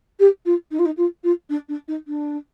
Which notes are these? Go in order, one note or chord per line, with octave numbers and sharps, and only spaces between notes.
G4
F4
D#4
F4
D#4
F4
F4
D4
D4
D#4
D4